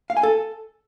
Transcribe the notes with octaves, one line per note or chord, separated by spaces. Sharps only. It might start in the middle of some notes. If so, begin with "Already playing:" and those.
F5
G#5
A4